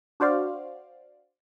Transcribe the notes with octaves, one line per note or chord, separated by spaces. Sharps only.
D4 F#4 C5 D5 F5